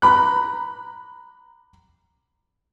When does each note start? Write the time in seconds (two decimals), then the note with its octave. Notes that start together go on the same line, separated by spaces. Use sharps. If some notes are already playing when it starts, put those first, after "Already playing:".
0.02 A#5 B5 F#6